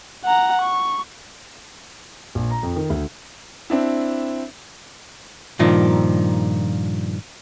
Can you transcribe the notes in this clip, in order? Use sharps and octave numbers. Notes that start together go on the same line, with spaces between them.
F#5 A#5
C#6
A#1
A#5
F2
D#3
D2
C4 D4 E4
G2 A#2 D#3 F3